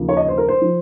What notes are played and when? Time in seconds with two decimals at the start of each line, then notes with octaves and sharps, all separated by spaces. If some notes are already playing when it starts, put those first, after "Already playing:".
Already playing: D#2 C#3 F3
0.09 C#5
0.17 D#5
0.28 C5
0.38 A#4
0.48 C5
0.61 F3